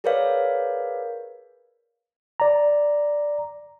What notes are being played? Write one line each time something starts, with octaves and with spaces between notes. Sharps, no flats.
G#4 A#4 B4 C#5 D5 F5
D5 A#5